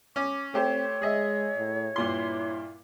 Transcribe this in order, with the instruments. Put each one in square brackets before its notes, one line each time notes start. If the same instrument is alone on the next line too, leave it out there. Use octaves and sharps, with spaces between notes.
[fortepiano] C#4 [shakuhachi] D6
[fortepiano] A3 G4 C5 [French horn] C4 [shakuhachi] C#5
[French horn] G#3 [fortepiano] G#4 D#5 E5
[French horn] A2
[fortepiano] G2 A#2 C6 [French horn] E4